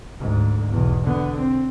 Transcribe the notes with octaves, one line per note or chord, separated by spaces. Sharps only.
D2 G#2
B1 E2
D3 B3
C4